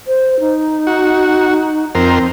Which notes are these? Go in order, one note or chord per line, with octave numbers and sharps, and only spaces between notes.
C5
D#4
F#4
F2 C4 A#4 C5